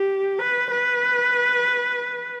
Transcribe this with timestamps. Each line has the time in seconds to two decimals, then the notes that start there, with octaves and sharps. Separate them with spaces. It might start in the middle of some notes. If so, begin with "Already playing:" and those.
Already playing: G4
0.39 B4
0.71 B4